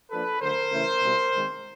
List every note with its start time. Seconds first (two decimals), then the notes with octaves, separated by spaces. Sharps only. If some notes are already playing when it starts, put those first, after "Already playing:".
0.11 F3 A#3 D4 A4 B4
0.41 D3 F#3 A3 A#4 C5
0.71 C#3 E3 A3 C#4 E4
1.02 B2 G3 C4 E4
1.32 D#3 G#3 C4